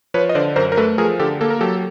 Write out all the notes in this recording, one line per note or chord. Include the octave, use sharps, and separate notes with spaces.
F3 B4 C#5
D#5
D3 C5 D5
F#2 A#4 C5
A#4
A3 A4 B4
F3 G#4 A#4
D3 G4 A4
A#3 A4
A#4
F#3 G4 A4